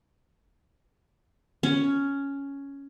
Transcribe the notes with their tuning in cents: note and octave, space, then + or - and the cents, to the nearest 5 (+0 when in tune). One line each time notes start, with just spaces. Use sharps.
C#4 +5